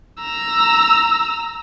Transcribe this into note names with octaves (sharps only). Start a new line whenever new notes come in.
A#5 E6